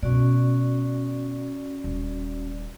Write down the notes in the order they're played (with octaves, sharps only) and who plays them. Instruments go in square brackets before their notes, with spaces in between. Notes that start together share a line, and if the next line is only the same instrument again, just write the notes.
[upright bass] B2 [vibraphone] C#4 F#4 D5
[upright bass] D#1